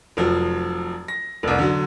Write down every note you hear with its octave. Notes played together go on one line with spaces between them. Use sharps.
F1 F3 F#3
A#6
F1 C2
D3 F#3